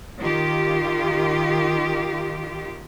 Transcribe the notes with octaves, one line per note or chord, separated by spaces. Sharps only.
D#3 F4 G4